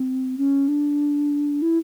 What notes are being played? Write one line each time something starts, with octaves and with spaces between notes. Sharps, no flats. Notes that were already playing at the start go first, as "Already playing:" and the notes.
Already playing: C4
C#4
D4
E4